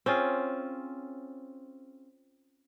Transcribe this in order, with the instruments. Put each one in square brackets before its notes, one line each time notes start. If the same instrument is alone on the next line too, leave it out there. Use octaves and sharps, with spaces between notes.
[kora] C4 C#4 F4 G#4